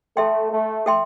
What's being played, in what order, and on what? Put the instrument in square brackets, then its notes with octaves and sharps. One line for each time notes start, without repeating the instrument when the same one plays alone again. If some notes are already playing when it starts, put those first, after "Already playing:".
[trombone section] A3 [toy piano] A4 E5 G5 C6
[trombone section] A3
[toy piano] A4 E5 G5 C6